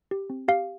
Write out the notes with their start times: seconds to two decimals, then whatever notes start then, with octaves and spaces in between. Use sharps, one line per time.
0.11 G4
0.30 C4
0.48 G4 F5